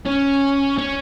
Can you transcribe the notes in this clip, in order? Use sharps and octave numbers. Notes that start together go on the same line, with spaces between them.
C#4
C#4